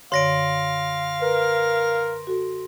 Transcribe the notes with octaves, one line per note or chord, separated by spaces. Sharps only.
F#2 D3 C#5 F5 C6 A#6 D7
A#4 B4
F#4 A4